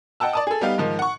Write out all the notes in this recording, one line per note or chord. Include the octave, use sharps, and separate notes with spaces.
D#5 F#5 G5 A5 E6
D5 A5 D#6
G#4 A4
G3 B3 D#4 G4 F5
G#2 D#3 F3
F#5 C#6